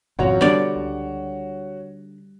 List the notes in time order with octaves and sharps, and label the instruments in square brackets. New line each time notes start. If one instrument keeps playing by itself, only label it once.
[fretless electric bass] G#1 F2 [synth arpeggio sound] B2 F4 A#5 [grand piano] F#4 C#5
[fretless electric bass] D3 [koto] G3 D5 [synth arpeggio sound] B3 D4 G#6
[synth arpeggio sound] C#2